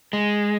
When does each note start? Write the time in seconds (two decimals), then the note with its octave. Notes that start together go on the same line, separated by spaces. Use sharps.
0.13 G#3